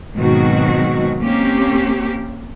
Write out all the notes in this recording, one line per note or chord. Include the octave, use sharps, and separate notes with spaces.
G#2 B2 D#3 F#3 C4 F#4
A#3 C4 C#4 G4